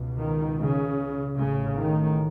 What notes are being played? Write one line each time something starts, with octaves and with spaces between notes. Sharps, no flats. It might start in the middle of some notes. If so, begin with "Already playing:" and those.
Already playing: C#2 B2
D#3
C#3
A1 A2 C#3
D#3